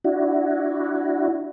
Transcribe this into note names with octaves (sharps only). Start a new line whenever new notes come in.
D4 E4 F#4